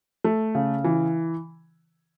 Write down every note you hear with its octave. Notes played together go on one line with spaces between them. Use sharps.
A3
C#3
E3